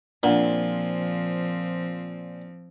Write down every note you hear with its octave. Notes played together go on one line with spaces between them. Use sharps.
A#2 F3 C4 D4 F#5